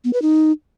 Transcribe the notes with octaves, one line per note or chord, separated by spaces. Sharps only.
B3
B4
D#4